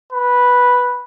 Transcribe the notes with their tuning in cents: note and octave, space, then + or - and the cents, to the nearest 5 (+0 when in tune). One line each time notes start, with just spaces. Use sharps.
B4 -5